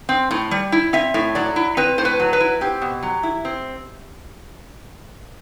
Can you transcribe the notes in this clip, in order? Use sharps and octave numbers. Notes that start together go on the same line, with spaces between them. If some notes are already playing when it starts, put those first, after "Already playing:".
C4
A2
G3
E4
C4 E5
A2
F#3 D5
E4
C4 B4
A2 C5
B4
F#3
B4
E4
C4 G4
B2
F#3
E4
C4